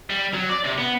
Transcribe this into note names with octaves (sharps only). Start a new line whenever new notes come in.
G3
F#3
D5
C3
B3